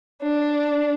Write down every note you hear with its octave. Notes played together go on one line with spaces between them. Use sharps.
D4